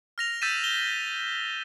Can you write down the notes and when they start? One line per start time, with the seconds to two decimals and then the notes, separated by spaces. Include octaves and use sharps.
0.18 F6 A#6 F7
0.42 E6 G6 A6 B6 D#7 E7
0.64 G7